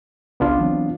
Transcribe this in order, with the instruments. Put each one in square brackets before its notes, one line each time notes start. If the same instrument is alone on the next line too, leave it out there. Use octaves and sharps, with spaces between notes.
[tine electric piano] G1 C2 C#3 [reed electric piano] B3 D4 F4
[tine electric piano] E3 F#3 C4